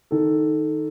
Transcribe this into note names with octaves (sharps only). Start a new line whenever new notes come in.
D#3 A4